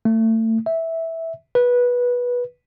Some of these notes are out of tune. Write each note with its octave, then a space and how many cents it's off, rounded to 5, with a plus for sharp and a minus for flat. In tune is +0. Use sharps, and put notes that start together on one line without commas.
A3 +30
E5 -10
B4 -15